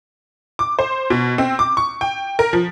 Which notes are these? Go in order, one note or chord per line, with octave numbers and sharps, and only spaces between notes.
D6
C5
B2
C4
D6
C#6
G5
A#4
F3